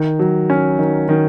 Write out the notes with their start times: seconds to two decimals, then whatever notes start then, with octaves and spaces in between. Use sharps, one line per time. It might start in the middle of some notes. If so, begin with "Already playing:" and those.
Already playing: D#3
0.19 F#3
0.50 C#4
0.79 D#3
1.09 D#3